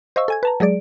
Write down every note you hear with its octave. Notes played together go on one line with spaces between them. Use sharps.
C5 D#5 F5 C#6 E6
A4 G#5 G#6
B4 A5 A#5
F#3 G#3 G#4 D5 D7